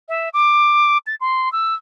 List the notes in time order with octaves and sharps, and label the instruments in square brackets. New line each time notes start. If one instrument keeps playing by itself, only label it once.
[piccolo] E5
D6
A6
C6
E6